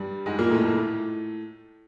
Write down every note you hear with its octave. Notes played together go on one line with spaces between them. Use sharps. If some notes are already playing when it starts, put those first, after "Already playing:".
Already playing: G2 G3
G#2 G#3
A#2 A#3
A2 A3
A2 A3